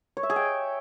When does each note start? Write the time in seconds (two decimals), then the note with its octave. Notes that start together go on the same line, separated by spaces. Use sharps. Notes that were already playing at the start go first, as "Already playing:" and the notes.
0.17 C#5
0.23 E5
0.30 G#4
0.36 G5